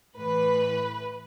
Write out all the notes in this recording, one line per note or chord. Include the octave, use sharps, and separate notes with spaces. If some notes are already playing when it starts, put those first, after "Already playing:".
A2 E3 B4